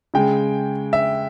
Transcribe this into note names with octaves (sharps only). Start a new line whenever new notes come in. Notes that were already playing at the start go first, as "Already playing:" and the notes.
C#3 G#3 G5
E5